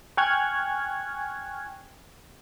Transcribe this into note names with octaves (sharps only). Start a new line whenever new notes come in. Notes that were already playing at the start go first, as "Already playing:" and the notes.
G5 G#5 C#6 F6 F#6 G#6